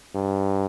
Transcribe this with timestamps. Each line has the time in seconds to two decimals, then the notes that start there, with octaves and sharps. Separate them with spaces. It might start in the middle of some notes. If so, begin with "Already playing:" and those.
0.15 G2